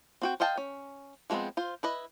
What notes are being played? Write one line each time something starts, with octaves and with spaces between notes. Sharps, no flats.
C4 F#4 G5
C5 D#5 F5 G5 A5
C#4
F3 G#3 A3 B3 C4
F4 C5
E4 B4 D#5